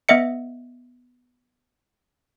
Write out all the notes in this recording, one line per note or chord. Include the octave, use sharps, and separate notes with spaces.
B3 D#5 E5 C#7